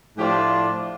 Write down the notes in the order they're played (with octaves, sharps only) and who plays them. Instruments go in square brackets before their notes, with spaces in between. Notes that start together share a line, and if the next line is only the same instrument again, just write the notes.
[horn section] A2 F3 A3 D4 F4 G4